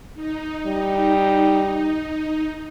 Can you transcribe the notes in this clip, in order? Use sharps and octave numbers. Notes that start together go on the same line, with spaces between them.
D#4
G3